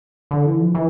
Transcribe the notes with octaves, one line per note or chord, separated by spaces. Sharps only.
D3
E3
F3
E3